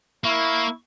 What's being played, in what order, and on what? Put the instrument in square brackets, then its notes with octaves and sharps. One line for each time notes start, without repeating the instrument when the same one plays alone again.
[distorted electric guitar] A#3 [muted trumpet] E4 [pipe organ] C#6